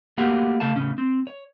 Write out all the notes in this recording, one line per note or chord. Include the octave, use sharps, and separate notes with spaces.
A3 A#3 F#4 G4 F5 F#5
C#3 A3 A4 F5 A5
A2 C#3 C#4
C4
C#5